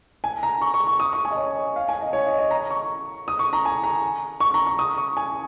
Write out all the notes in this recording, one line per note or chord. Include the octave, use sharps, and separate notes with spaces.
G#5
A#5
C#6
C#6
C#6
D#6
C#6
G#5
D#5
C#5
D#5
F5
G#5
D#5
C#5
D#5
D#5
A#5
C#6
D#6
C#6
A#5
G#5
A#5
C#6
A#5
C#6
D#6
C#6
G#5